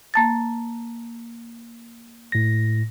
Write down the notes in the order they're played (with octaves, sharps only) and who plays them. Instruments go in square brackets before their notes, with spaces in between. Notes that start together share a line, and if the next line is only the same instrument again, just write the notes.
[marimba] A#3 A5 A6
[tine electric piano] A2 A#6